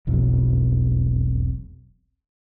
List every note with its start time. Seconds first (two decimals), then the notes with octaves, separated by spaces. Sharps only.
0.07 E1 B1 F2